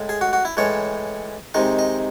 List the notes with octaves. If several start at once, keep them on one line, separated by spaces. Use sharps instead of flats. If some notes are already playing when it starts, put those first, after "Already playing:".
Already playing: A2 G#3
G#4
F#4
F#4
E4
A2 E3 G#3 C#5
C3 D#3 G#3 D#5
D#5